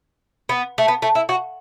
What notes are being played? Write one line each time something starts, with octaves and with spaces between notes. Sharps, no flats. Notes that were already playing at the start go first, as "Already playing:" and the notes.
B3
A3
B3
A3
E4
F#4